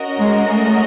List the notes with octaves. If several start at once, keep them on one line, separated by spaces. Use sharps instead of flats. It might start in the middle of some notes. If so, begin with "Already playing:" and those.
Already playing: C#4 F#4 A#4 D#5
G#3
A3